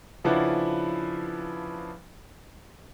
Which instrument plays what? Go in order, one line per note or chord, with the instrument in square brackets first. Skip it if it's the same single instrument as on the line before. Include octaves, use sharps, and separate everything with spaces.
[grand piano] C#3 F3 D4 E4 B4 F#5